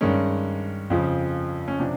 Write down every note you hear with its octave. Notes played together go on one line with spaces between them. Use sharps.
G2 D#3 G#3 C#4
F2 C#3 F3
C#4
C3 F3 D4